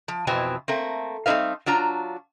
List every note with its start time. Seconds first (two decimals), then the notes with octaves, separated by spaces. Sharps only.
0.08 F3
0.27 F2 B2 E3 C4 G#5
0.68 A3 A#3 C4
1.26 G3 A3 C4 D#4 B4 F5
1.66 F#3 D4 F4 A#5